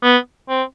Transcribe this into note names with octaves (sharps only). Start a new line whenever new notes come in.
B3
C4